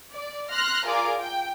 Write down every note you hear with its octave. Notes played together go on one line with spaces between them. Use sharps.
D5
C6 F6 F#6 A#6
F4 G#4 A#4 D5 D6
G5